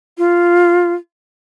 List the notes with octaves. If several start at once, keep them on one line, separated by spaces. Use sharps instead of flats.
F4